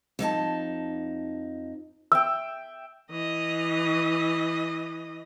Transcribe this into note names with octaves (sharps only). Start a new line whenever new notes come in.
F2 D#4 G4 A5
E5 G5 E6
E3 D#5